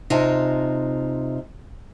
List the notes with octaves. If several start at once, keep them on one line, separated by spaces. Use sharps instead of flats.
C3 D#4 F4 G#5 A5